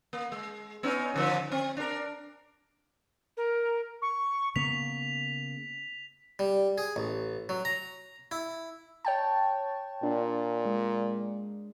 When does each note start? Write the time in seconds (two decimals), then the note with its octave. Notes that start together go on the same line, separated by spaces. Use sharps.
0.13 A#3
0.32 G#3
0.83 B3 C#4 D#4
1.14 G#2 D3 F3
1.51 C4
1.77 D4 A#4
3.37 A#4
4.02 C#6
4.56 C#3 A#3 B3 B6 F7
6.39 G3
6.78 G#4
6.96 A1
7.49 F#3
7.65 A#5
8.31 E4
9.05 C#5 G5 A5
10.03 A#2 D4
10.65 G#3